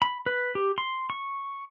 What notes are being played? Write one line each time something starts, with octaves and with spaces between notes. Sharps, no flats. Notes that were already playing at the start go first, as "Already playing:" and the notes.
B5
B4
G4
C6
C#6